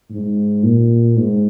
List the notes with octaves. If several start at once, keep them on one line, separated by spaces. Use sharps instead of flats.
G#2
A#2
G#2